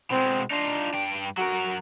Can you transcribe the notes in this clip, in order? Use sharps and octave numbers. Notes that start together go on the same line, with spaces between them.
B2 G#3 C4
D4 D#4 F4
G2 G5
F#3 F#4 A#4